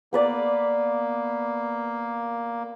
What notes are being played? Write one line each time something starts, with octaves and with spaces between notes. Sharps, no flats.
A#3 B3 B4 D5